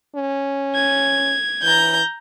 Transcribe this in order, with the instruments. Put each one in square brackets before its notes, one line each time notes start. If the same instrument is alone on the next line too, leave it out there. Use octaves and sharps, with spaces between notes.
[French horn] C#4
[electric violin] G#6
[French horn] E3 [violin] A#5 G6